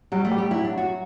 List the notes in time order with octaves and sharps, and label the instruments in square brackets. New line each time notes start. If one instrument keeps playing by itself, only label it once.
[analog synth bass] F#3 [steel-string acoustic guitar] G3
[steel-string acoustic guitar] A3
[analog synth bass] G3
[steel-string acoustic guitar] G4
[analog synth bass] F#3 [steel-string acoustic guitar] E4
[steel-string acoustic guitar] D4
F#4